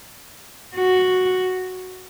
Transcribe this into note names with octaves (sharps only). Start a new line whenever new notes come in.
F#4